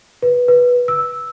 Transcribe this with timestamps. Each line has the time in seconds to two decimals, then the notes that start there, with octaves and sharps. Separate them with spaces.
0.23 B4
0.48 B4
0.88 E6